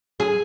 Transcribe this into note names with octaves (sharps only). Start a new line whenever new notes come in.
G#4